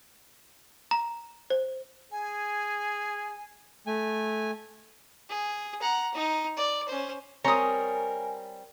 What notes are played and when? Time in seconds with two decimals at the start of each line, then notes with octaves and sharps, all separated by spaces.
0.91 A#5
1.50 C5
2.12 G#4 G#5
3.87 A3 G#5
5.29 G#4
5.81 F#5 A#5
6.14 D#4
6.57 D5
6.88 C#4 C5
7.44 G3 C4 A#4 C#5 G#5 A#5 D#6